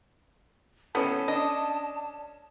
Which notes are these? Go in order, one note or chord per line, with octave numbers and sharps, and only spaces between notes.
A2 B3 C#4 A4 A5
D4 D#5